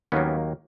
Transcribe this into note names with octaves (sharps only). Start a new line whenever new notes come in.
D#2 D#3 F#3 A#3 B3 C#4